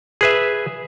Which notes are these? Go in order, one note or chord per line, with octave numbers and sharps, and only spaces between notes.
G#4 B4 E5